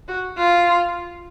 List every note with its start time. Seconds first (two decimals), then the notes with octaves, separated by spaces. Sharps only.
0.08 F#4
0.37 F4